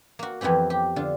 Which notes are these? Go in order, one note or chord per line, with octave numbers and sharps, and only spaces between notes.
A#3 F#4
F2 E3 B3 C4 G4
G4
D3 F4